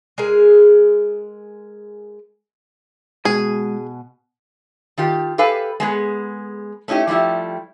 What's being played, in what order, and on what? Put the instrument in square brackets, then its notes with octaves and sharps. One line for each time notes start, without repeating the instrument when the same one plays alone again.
[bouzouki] G#3 G#4 A#4
[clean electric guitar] B2 F#4 G#5 [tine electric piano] G#3 [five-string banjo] G#4
[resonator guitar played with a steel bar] D#3 F4 G4
G4 A4 B4 F5 G#5
G#3 B3 G#4
A3 C#4 D#4 E4 G4
F3 G3 A3 E4 G4